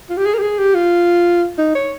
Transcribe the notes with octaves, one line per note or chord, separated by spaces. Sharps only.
F4
G4
G#4
A#4
G4
G#4
G4
F4
D#4
C#5